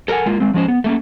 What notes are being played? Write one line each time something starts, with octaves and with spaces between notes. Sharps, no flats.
A4 A#4 C#5 F#5 G#5
G#3 A#3 F4
G#3 C4
F3 G#3 C#4 C5
B3
A3 A#3 C#4